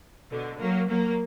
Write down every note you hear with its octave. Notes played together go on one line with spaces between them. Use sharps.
B2 D3
F#3 A#3
F#3 A#3